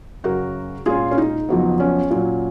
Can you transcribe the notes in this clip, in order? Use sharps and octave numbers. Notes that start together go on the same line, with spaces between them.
F#2 C#3 F#3 F#4 A#4
A#2 G#3 C#4 F4 G#4
C#4
D#4
F2 C#3 F#3 B3
C#4
A#2 F#3 C#4